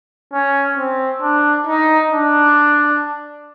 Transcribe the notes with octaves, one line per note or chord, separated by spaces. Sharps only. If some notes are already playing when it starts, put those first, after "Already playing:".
C#4
C4
D4
D#4
D4